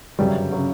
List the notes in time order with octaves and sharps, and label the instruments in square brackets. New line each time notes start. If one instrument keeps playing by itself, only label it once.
[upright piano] G1 F#2 C#3 F#3 [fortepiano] G3
[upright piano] C#3 F#3